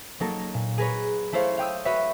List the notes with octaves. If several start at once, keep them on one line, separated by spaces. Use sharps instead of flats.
F#3 A#3 D#4 A4 A#4
A#2
G#4 A#4 B4 C#5
A3 E4 A4 C5 C#5 F5
F5 G5 D#6 E6
F#4 B4 C#5 E5